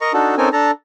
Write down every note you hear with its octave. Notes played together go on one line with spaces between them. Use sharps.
A#4 D#5 A#5 C#6
D4 D#4 F#4 A4
C4 C#4 D#4 A4 A#4 G#5
D4 A4 A5 A#5